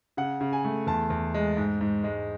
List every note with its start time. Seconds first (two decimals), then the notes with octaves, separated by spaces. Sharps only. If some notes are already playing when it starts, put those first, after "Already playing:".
0.17 C#3 F#5
0.41 C#3
0.53 G#5
0.65 A3
0.87 E2 A5
1.10 E2
1.34 G#3
1.57 G#2
1.81 G#2
2.04 G#3